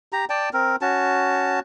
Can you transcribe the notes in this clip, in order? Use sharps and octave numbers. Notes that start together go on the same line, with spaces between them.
G4 A#5
D5 G5 A5
C4 A#4
C#4 F#4 A5